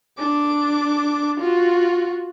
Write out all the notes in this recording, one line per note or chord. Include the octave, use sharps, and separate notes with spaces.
D4 D6
F4 F#4